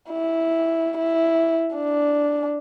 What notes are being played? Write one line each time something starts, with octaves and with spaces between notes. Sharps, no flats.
E4
E4
D4